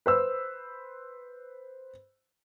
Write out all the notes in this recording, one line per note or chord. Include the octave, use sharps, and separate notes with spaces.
B4 C5 E6